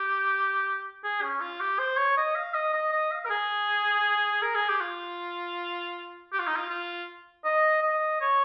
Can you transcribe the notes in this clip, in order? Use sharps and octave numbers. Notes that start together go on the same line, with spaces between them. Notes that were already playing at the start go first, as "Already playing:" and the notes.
Already playing: G4
G#4
C#4
F4
G4
C5
C#5
D#5
F5
D#5
D#5
D#5
F5
A#4
G#4
A#4
G#4
G4
F4
G4
F4
D#4
F4
F4
D#5
D#5
C#5